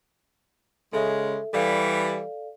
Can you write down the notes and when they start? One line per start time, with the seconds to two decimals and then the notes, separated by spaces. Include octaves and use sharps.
0.93 C#3 G#3 A4 E5
1.53 E3 G3 A4 D5 F5